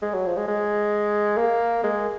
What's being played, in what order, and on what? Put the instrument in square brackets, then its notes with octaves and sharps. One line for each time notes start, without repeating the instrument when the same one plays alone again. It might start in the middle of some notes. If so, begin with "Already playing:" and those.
[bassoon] G#3
F#3
F3
G#3
G#3
A#3
G#3